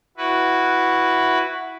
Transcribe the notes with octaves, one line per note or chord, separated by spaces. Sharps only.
E4 F#4 B4